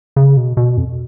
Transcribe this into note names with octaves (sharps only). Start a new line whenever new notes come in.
C#3
B2
B2
F2